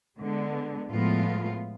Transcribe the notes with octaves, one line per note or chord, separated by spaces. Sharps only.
D3 G#3 B3
A2 F3 G#3 B3 F4